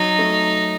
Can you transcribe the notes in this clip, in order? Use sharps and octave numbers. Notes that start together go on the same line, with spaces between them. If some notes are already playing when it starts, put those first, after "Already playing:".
Already playing: F#3 D#4
A3